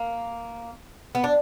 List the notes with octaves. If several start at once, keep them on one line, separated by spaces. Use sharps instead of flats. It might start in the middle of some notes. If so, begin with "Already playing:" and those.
Already playing: A#3
B3
D4